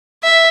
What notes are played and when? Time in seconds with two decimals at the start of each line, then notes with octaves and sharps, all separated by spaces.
0.23 E5